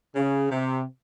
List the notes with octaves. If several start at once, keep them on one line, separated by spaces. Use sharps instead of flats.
C#3
C3